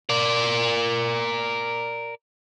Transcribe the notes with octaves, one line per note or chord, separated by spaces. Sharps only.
A#4 D5